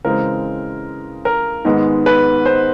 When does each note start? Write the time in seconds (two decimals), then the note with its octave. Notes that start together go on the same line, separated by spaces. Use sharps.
0.05 C#3 E3 G#3 C4 A#4
1.25 A#4
1.65 G#2 D#3 G#3 B3
2.06 B4
2.46 C5